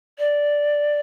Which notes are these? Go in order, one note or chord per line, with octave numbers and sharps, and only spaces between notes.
D5